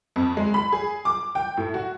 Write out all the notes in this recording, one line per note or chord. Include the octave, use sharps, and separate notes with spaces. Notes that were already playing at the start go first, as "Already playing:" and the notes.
F2
G#3
B5
G#4
D6
G5
A2
F#4